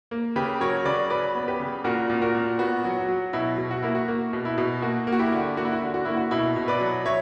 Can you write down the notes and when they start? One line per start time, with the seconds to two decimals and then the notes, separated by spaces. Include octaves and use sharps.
0.11 A#3
0.36 C#3 G4 B4
0.60 F#3 A#4 C#5
0.85 C#3 B4 D5
1.10 F#3 B4 D5
1.35 B3
1.48 G4 B4
1.60 C#3
1.84 A#2 F#4 A#4
2.10 A#2
2.22 F#4 A#4
2.35 A#2
2.59 B3 F#4
2.85 F#3
2.97 F#4
3.09 F#3
3.33 B2 E4
3.58 B2
3.71 F#4
3.82 A#3 E4
3.95 F#4
4.08 A#3
4.33 B2
4.45 E4
4.58 B2
4.82 A#3 F#4
5.07 A#3
5.12 F#4
5.19 E4 G4
5.32 D3
5.57 A#3 F#4
5.65 E4
5.73 F#4
5.82 D3
5.94 F#4
6.05 A#3 E4
6.17 F#4
6.31 B2 E4
6.56 B2
6.68 B4 D5
6.80 F#3
7.05 F#3 C#5 E5